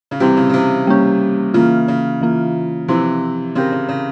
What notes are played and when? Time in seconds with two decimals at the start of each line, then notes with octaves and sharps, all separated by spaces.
0.11 C#3
0.20 C3 E3 G3 C4 G4
0.37 C#3
0.49 C#3
0.54 C3
0.87 G3 A#3 C#4 G4
1.54 C#3 E3 A#3 F4
1.88 C#3
2.21 E3 A#3 F4
2.88 C3 E3 F3 C4 E4
3.55 C#3 C4 G4 A#4
3.72 C#3
3.89 C#3